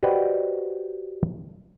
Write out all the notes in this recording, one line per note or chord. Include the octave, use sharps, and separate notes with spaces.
F#4 G4 B4 C5 D5 D#5